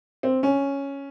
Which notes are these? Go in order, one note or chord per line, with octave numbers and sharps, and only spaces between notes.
C4
C#4